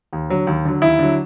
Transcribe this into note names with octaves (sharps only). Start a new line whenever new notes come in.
D#2
D3 F#3
D#2
D3 F#3
D#2 E4
D3 F#3